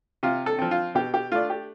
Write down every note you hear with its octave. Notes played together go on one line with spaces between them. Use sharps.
C3 F4
A4
F3 C4
F4
B2 G4
G4
A3 D4 F4
G4